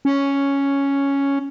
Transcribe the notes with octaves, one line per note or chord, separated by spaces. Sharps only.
C#4